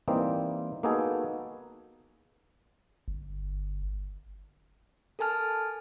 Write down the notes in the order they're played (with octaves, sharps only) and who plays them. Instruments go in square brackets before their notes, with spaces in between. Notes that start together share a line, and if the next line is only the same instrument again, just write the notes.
[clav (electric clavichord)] E3 G3 A#3 C4 D#4
A#3 B3 D#4 F#4 G#4 A4
[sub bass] G1
[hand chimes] A4 A#4 G#5 A5 F6